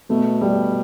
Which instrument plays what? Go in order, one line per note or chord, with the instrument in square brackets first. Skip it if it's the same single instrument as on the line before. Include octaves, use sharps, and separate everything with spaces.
[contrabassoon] B2 [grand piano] A3
[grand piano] G3